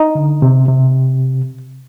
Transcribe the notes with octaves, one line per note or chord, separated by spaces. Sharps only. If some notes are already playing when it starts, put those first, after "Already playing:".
Already playing: D#4
D3
C3
C3